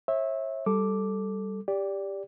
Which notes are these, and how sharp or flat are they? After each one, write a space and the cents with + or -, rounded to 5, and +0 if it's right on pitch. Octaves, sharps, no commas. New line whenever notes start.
C#5 -40 E5 -15
G3 -5 A4 +0 D6 +0
G4 +15 D5 -15